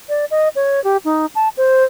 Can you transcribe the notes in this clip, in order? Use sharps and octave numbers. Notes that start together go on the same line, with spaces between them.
D5
D#5
C#5
G4
D#4
A5
C5